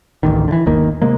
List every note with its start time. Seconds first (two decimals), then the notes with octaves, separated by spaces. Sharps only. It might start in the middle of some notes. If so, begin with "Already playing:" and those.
0.23 D1 A1 D#3
0.48 D3 E3
0.66 G1 D#2 D#3 A#3
1.02 C3 G#3 A#3